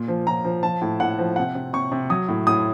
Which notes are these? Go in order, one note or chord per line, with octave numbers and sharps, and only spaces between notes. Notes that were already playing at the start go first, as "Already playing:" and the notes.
Already playing: A#2
F3
F3 A#5
F3
F3 A5
A2
A2 F#5
F3
C3 F#5
C3
C3 C#6
C3
F#3 D#6
A2
A2 D#6